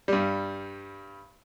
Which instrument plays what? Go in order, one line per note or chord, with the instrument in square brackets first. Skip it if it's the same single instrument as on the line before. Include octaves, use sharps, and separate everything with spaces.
[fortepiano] G2 G3